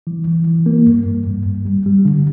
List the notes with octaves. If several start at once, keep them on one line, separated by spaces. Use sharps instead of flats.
E3
E3
E3
A#3
G2
G2
G2
G2
G3
G3
D3